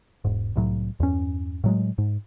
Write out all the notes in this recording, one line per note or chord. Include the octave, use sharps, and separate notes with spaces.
E1 G#2
C2 A2 F#3
E2 G2 C#4
A2 F#3 G#3
G#2